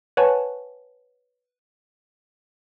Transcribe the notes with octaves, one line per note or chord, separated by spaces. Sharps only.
B4 C#5 F#5 G#5 A5 C#6